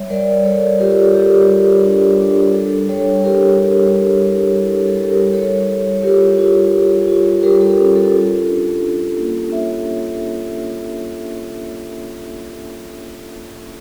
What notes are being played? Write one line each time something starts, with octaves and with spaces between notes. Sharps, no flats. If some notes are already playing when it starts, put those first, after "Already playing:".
Already playing: G3 C#5 E5
G3 A#4 D5
G3 A4 C#5
F4 G4 A#4
A4
G3 G4
G3
D4
D4
G3 A4
G3 A4 C#5
E4 G4 A#4
G3
G3
E4
E4 A4
A4
G3
G4 A#4
G3 A4 C#5
G3
C#5
F4 G4 A#4
F4
F4
F4
G3 G4 A#4
A4
C#4
A4
F4
D4
D4
A#3
A#3 C#5 E5